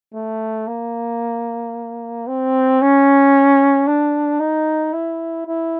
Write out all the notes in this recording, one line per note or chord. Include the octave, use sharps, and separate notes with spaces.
A3
A#3
C4
C#4
D4
D#4
E4
E4